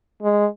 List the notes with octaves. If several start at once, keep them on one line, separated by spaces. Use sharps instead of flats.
G#3